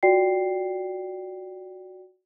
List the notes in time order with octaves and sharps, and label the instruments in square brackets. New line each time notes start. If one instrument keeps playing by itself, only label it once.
[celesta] F4 F#4 D5 G5 C7